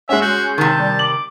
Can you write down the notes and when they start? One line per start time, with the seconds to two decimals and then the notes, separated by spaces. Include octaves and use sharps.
0.09 G#3 C#4 E5 F#5
0.22 F#4 G6
0.58 C3 D#3 A5
0.79 G3
0.99 D6 F#7